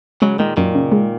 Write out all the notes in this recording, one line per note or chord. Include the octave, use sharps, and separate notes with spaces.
C#3 F#3 G#3
A#2 D#3 G#3
F#2 A#2 D#3
C#3
G#3